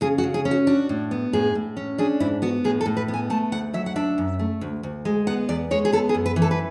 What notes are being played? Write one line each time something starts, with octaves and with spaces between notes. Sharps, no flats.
C#3 G#4
F#4
C#3
G#4
C#4
F#4
D4 F#4
A2
B3
A2 G#4
A2
C#4
D4 G#4
G#2 E4
B3 F#4
A2 G#4
A4
A2
B4
B3
G#5
A3 A5
D2 F#5
F#3 E5
F#5
D4 E5
F#2
A3
D2
D2
G#3
B3 F#5
E2 D5
G#3 C#5
G#4
B3 A4
G#4
F#2
B4
E3
A4
B4